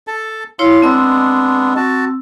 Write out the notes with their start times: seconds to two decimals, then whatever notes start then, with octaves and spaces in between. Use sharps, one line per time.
0.07 A4 A5
0.59 E4 C#5 F5 C6
0.82 G#3 B3 C4 D4 E6
1.76 F#4 A5